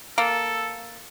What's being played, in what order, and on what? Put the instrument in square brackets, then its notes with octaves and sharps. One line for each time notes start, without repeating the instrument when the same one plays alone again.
[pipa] A#3 [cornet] A4